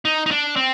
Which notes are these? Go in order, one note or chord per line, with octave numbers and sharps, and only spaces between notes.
D#4
D#4
D4
C4